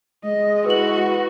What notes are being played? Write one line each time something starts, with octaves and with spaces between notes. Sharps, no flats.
G#3 D#5
E4 F#4 B4 F#7